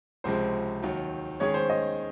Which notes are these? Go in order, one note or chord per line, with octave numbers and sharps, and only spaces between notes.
C#2 C3 F3 G#3 C5
D#2 D#3 F#3
D#3 G#3 C#4 G#4 C#5
C5
D#5